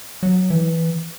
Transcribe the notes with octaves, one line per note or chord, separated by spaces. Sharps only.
F#3
E3